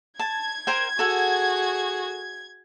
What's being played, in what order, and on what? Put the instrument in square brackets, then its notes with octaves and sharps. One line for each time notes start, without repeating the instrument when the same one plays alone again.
[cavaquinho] A5 [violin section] G#6
[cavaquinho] A#4 C5 G5
[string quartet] F#4 G#4 [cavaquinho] A4 F#5